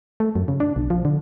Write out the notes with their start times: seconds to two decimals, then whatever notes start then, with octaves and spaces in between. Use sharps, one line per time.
0.20 A3
0.35 F#2
0.48 C#3
0.60 D4
0.76 B1
0.90 F3
1.05 D3